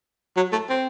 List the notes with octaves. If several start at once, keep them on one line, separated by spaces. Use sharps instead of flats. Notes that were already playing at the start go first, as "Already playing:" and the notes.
F#3
A3
C4